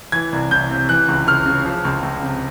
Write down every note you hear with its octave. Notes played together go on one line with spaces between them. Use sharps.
E3 G#6
C2
C2 G6
C3
E3 F#6
C#2
C#2 F6
C#3
F3
C#2
C#2
C3